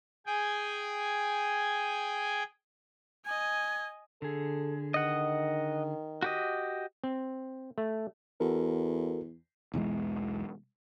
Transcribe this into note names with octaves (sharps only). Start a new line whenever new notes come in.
G#4 G5 G#5
D#5 G#5 G#6
D3 G#4 A4
D#3 D#5 F#5
F#4 G4 D#5
C4
A3
E2 F#4 A4 A#4
B1 E2 E3 G#3